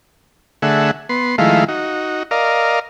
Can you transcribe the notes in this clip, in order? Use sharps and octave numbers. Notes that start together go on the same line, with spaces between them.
D3 A3 G#4 E5 F#5
B3 C6
D#3 F3 G#3 A3 E4 F5
D#4 F#4
A#4 D5 D#5 F5